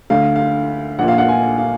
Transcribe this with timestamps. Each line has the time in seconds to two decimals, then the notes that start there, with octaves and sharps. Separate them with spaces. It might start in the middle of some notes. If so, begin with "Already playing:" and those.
0.10 D2 D3 F5
0.36 F5
0.99 A#1 A#2 F#5
1.08 F5
1.18 F#5
1.28 G#5
1.58 F5